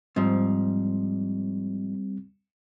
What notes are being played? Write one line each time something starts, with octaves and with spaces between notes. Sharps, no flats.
G#2 F3 G3 C4